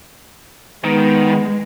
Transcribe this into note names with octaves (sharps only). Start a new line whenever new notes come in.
D#3 G#3 B3